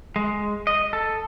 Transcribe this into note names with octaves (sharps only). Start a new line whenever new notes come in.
G#3
D#5
A4